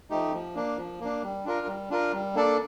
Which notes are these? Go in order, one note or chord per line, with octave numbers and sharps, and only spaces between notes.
F3 A3 D#4 G4
F3
A#3 D4
F3
A#3 D4
G3
D4 F4 A#4
G3
D4 F4 A#4
G3
A#3 D4 A4 D5